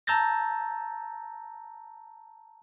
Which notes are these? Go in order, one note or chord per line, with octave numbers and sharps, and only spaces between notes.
A5 A#5 E6 G6 A6 A#6